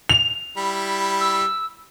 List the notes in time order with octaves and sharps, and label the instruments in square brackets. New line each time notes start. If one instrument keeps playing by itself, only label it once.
[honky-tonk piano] F7
[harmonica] G3 E4 B5
[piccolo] E6